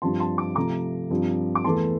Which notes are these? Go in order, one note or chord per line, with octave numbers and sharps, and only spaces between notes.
G2 F3 C4 A5 C6
A5 C6
D6
C3 F3 A3 A#5 D6
G2 F3 C4
D6
E2 E3 A3 A5 C6